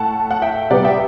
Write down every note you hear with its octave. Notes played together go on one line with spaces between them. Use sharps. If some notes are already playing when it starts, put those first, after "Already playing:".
Already playing: A2 A3 F#5 A5
F#5
E5 G5
C3 G3 B3 D5 F#5
E5 G5